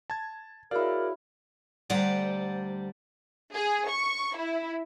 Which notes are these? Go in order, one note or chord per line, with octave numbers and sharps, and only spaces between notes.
A5 G#6
E4 F#4 G#4 A#4 C#5 D5 F5
D2 G3 C5 D5 F#5 A#5
G#4
C#6
E4